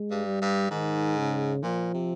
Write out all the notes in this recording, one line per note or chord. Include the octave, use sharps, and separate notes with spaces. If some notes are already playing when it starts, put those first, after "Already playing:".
Already playing: G#3
G2
G3
G2
G#2 D#3
C#3
A#2 F3
C3